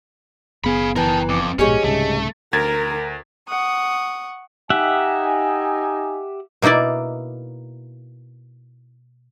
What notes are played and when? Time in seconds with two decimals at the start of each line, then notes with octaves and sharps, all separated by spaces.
0.64 F#1 B3 G#4 F5 B5
0.96 E3 A#4 G5 A5
1.29 F2 D6
1.59 A#1 G#2 B2 C#4 G4 G#4 C#5 D#5
1.84 C2 G#2 C#3 A3
2.53 D2 A#4 G#6 A6
3.47 F#5 C#6 D#6
4.70 D#4 G4 E5 F#5 G#5
6.62 B2 A#3 D#4 E4 D5